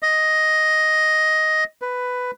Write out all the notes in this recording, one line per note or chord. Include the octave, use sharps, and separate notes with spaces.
D#5
B4